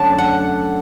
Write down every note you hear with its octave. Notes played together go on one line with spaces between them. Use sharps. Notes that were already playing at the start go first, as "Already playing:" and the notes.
Already playing: F#2 D3 F#3 A3 D4 A5
F#5